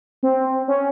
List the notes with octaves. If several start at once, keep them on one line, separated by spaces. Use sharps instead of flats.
C4
C#4